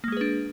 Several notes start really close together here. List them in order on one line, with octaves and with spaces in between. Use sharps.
A#3 G#3 G#4 B4 D4